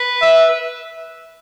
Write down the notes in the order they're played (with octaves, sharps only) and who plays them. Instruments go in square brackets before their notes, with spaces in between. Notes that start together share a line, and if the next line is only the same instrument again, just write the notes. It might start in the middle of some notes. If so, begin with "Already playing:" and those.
Already playing: [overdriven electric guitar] B4
[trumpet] E5